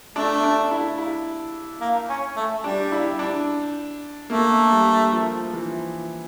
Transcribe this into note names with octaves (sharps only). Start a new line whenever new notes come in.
A3 D4
D4
E4
E4
A#3
C#4
A3
G3 D4
E4
D4
A3 A#3
G3
F3
F3
E3